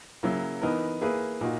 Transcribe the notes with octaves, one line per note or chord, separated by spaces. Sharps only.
C#3 F#3 A#3 E4
E3 B3 D#4 A#4
A#3 E4 G#4 B4
A#2 A#3 D#4 F#4